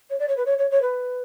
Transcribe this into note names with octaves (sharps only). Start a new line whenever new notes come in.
C#5
D5
C#5
B4
C#5
C#5
C#5
B4